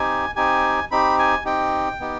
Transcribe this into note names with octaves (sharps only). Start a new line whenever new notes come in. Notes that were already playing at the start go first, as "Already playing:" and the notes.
Already playing: C4 D#4 G4 G#5
C4 D#4 G4 G#5
C4 D#4 G4 B5
G#5
C4 D#4 G4 G5
B3 D#4 G4